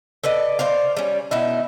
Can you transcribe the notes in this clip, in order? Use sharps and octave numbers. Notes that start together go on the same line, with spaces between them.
A4 B4 D5 D#5
C5 D5 F5
G3 C#4
B2 D#4 E4